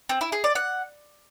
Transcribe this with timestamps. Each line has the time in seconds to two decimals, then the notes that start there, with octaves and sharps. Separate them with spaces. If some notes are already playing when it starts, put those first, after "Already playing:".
0.09 C4
0.21 E4
0.32 G#4
0.44 D5
0.55 F#5